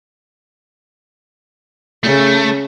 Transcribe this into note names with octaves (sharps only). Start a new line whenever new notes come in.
C#3 A3